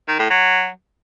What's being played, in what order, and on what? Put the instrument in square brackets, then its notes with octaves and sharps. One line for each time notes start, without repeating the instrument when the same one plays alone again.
[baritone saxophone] D#3
A2
F#3